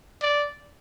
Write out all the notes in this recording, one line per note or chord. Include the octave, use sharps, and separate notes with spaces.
D5